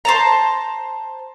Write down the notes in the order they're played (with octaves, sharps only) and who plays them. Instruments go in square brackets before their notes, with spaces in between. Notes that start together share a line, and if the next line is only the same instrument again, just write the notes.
[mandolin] C5 A5 A#5